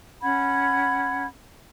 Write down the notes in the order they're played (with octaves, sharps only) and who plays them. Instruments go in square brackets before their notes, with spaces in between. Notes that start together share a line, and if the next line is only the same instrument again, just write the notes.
[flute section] C#4 F#5 B5 G#6